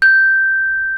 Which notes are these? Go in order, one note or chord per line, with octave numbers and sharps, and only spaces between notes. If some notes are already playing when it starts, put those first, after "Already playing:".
G6